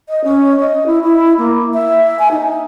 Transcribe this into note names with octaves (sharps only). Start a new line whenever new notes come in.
D#5
C#4
D#5
E4
E4
A#3
E5
G#5
D#4